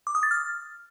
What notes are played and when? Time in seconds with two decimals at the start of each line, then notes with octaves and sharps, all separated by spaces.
0.07 D6
0.15 D#6
0.23 A6
0.31 F6